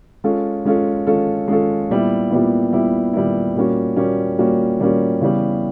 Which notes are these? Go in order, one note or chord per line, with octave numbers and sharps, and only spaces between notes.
G#3 C#4 F4 A4
G#3 C#4 F4 A4
G#3 C#4 F4 A4
G#3 C#4 F4 A4
A#2 G3 B3 E4
A#2 G3 B3 E4
A#2 G3 B3 E4
A#2 G3 B3 E4
A#2 G3 A#3 C#4 F#4
A#2 G3 A#3 C#4 F#4
A#2 G3 A#3 C#4 F#4
A#2 G3 A#3 C#4 F#4
C#3 E3 G3 B3